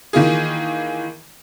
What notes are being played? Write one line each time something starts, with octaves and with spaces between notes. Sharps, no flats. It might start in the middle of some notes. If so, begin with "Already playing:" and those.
D#3 E3 A#3 F4 G#4